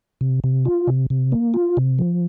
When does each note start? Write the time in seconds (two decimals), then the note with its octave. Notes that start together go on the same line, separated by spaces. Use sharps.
0.21 C3
0.44 C3
0.65 F4
0.87 C3
1.10 C3
1.32 A#3
1.54 F4
1.77 C3
1.99 F3